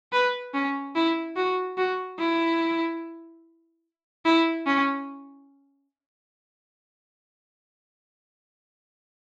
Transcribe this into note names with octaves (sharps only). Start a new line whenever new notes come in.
B4
C#4
E4
F#4
F#4
E4
E4
C#4